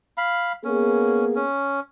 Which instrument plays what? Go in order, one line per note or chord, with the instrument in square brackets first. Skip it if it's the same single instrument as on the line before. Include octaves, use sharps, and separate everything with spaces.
[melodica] F5 B5
[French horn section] A#3 B3 G#4 [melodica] C#4
[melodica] C#4